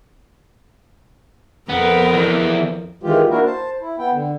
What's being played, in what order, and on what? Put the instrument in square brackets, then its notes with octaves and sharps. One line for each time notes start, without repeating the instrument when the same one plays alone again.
[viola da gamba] F2 F3 A#4 [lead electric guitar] B3
[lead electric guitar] E2 E3
[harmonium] D#3 E3 G#3 F4 G4
A#3 D4 E4 F#4 A#4
C5 A5
E4
B3 G5
D3